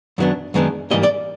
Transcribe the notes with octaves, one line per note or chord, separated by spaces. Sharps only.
F#2 D#3 F#3 B3 D4
F#2 D#3 G#3 B3 D4
G#2 E3 G3 A#3 D#5
D5